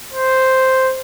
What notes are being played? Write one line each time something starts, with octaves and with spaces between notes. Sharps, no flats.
C5